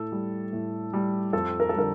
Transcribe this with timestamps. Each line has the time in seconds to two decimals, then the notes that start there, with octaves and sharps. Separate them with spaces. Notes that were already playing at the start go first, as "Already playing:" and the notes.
Already playing: A2 A4
0.12 G3
0.53 A2
0.93 G3
1.33 F2 A4
1.60 A#4
1.69 A4
1.74 D3 G3 A#4